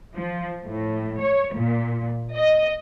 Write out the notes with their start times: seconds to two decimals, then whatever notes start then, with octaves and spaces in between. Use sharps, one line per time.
0.16 F3
0.65 A2
1.23 C#5
1.56 A#2
2.36 D#5